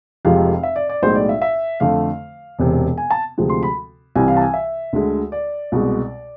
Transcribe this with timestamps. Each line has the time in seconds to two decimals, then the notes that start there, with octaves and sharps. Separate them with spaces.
0.25 F1 F2 C3 F3 G#3 F5
0.63 E5
0.76 D5
0.89 D5
1.03 B1 A2 G#3 C5
1.15 D5
1.29 E5
1.42 E5
1.80 F2 D3 A3 F5
2.59 E1 E2 C3
2.98 G#5
3.11 A5
3.38 D2 C3 F3 G#3
3.49 C6
3.63 B5
4.16 C2 C3 E3 G#5
4.28 F5
4.37 A5
4.42 G#5
4.54 E5
4.93 D2 D3 G#3
5.32 D5
5.72 C2 B2 G#3